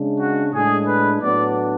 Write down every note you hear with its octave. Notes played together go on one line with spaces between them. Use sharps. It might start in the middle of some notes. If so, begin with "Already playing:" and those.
Already playing: C#3 G#3 D4
F#4
A2 G#3 D4 G#4
B4
A2 F#3 B3 D4 D5